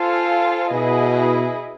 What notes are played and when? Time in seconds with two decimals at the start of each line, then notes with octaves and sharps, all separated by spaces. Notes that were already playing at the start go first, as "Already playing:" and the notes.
Already playing: F4 A4 C5 F5 G#5
0.72 B2 E4 G#4 B4 D#5